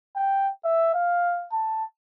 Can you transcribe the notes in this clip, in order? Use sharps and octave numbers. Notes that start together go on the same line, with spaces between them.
G5
E5
F5
A5